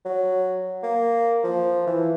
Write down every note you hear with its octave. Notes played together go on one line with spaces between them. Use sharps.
F#3
A#3
F3
E3